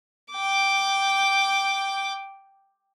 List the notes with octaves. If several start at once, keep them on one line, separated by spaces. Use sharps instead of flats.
G5 D6